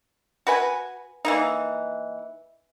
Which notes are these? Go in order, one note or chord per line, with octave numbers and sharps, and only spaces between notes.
F#4 B4 G#5
E3 A#3 D#4